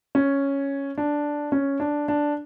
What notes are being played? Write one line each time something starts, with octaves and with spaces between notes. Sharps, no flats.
C#4
D4
C#4
D4
D4